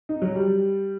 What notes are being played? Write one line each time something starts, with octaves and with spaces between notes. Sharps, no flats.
D#4
F#3
G3